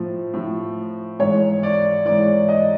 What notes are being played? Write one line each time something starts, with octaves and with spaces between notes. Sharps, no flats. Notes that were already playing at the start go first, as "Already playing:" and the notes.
Already playing: A2 F3
A2 F3
G#2 E3 C#5
D5
G#2 E3 D5
D#5